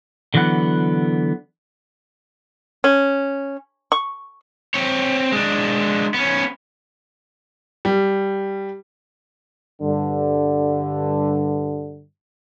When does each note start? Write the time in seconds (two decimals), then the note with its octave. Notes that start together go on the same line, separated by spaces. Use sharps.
0.34 D3 E3 F#3 B3 F#5
2.84 C#4
3.92 C#6
4.74 C4 C#5
5.32 G#3 D4
6.14 B3 C#4
7.85 G3
9.81 G2 D3